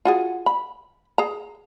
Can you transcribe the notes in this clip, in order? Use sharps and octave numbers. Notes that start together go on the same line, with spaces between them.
F4 F#4 G#4
B5
G#4 A#5